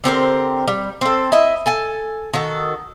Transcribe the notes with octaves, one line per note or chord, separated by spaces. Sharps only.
D3 C4 G4 A#4
G3
C4 A4
E4 D#5 E5
A4 G#5 A5
D#3 F#4 A4